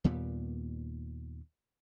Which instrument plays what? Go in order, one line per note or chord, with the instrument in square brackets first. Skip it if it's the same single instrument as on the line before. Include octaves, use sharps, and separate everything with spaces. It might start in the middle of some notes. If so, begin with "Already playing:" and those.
[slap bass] D#2 A#2 G3 B3